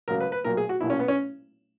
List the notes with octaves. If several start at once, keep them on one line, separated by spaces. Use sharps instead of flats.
C#2 C#3 F#3 A#4
B4
B4
B1 A#2 F#3 A#4
G#4
F#4
B1 A#2 F#3 E4
C#4
B3
C#4